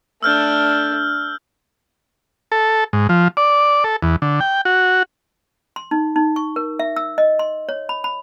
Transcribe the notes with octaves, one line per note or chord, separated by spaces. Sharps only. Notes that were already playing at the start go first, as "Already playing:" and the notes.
A3 D4 E6 F6 G6
A4
G#2
F3
D5
A4
E2
D3
G5
F#4
C6
D#4
D#4
C#6
A#4
E5
E6
D#5
C6
C#5
B5
B5